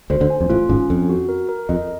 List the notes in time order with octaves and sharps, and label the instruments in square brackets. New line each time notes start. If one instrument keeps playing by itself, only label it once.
[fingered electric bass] D2 D3 [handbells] C5
[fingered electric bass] D2 D3
[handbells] G#5
[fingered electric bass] F2
[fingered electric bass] A1 A2 [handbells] F4
[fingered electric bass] G#1 G#2 [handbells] C#4
[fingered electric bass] F2 [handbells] A4
[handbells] F#4
A#4
A#4
[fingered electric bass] F2 [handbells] D#5